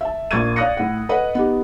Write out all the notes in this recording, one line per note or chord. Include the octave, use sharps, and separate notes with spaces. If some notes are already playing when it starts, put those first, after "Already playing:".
E5 A5
A#1 A#3 C#6 G#6 A6 D#7
D5 F5 D#6 F#6 A#6 C#7
A2 F#5
A4 B4 D#5 F#5
B3 D#4 G4